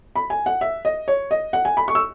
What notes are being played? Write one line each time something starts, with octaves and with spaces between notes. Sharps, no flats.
B5
G#5
F#5
E5
D#5
C#5
D#5
F#5
G#5
B5
C#6
E6